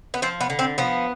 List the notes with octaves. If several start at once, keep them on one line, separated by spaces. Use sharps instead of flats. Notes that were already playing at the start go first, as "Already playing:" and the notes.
B3
F3 C4
B3
D3
C4
F3 B3